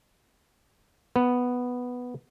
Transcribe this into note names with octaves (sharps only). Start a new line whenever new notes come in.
B3